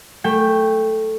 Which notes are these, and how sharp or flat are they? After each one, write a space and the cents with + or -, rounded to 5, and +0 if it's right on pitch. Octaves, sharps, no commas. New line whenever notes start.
A3 +0 G5 +10